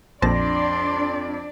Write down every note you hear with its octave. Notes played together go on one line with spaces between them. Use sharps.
A#1 F2 D4 C5 D5 A5 C6 A#6